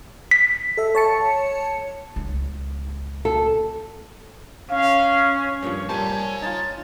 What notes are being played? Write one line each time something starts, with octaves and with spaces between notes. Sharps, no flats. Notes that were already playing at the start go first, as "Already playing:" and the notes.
B6
A4 E5
C#5 A5 C#7
C#2
A4
C#4 F5
G2 A#2 F3 C#5
G3 A#3 C5 C#5 G#5 A5
D#4 F4 A6